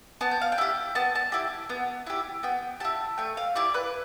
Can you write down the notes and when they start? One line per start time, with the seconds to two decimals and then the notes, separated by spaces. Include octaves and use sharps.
0.21 B3 A5
0.31 G5
0.42 F5
0.52 G5
0.58 E4 G4
0.95 B3 A5
1.15 A5
1.32 E4 G4
1.69 B3
2.06 E4 G4
2.43 B3 G5
2.80 E4 G4 A5
3.18 A3 G5
3.37 F5
3.55 E4 G4 D5
3.74 B4